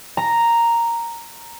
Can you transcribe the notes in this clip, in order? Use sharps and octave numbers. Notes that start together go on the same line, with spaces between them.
A#5